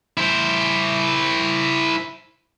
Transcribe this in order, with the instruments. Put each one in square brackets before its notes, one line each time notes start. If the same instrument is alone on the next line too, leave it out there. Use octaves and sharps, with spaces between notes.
[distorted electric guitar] E4 C5